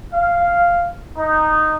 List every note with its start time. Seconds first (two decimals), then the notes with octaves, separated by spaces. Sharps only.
0.13 F5
1.17 D#4